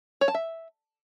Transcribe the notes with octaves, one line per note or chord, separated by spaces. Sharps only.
C#5
A5
E5